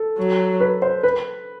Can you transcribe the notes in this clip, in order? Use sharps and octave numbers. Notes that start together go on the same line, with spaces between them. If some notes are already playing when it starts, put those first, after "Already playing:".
Already playing: A4
F#3
B4
C5
B4